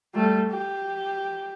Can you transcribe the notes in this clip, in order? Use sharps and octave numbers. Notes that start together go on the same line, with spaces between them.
G3 A3
G4